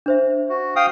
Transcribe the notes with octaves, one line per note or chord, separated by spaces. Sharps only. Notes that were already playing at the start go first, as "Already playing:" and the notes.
D4 C5 E5
F#4
F5 G5 D#6